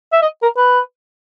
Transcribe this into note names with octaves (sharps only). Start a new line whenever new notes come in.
E5
D#5
A#4
B4